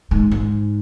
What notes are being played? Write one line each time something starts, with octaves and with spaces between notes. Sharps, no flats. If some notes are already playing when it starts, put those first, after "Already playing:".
G#2
G#2